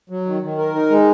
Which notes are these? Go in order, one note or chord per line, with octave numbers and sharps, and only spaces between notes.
F#3
D#3
D#3
A#4
D#4
G#3